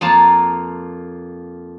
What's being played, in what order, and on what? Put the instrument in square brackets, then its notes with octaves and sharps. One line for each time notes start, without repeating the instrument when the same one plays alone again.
[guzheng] F2 A#3 F4 A5